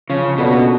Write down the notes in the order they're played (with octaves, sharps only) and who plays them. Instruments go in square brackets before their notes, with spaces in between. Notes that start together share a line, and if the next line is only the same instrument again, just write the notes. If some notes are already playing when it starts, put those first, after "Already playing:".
[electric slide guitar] C#3 [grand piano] F3
[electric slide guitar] B2 [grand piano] A#3 D4 F#4 A4